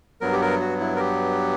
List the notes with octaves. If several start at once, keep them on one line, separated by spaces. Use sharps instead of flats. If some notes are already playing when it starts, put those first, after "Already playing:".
G2 F#3 B3 A#4
G4
A#4
F#4
E4
A#4
G4